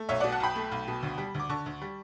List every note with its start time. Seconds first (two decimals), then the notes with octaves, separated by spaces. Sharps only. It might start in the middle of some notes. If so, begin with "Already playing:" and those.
Already playing: A3
0.09 B1 C#5 E5
0.20 B2 D5 F#5
0.32 F#5 A5
0.40 B1 G5 B5
0.56 A3
0.72 B1
0.87 B2
1.03 D2
1.18 G3
1.34 D2
1.40 D6
1.49 D3 A5 C#6
1.66 D2
1.81 G3